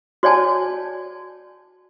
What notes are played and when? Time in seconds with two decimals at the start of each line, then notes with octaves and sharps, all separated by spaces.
0.23 F#4 C#5 D5 G#5 A5